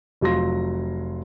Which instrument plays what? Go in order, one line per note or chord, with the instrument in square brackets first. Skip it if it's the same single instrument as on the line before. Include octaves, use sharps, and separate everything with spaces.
[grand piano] F1 F#3 F4 C6 A#6